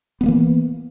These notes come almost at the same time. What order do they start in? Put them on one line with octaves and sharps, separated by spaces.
B3 G3 A#3 E3